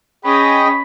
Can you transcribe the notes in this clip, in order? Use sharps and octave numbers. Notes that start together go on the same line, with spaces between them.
C#4 G#4 D#5 G5 B5